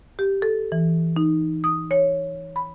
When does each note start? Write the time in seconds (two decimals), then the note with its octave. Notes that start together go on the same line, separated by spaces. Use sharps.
0.19 G4
0.42 A4
0.72 E3
1.16 D#4
1.64 D#6
1.91 C#5
2.56 B5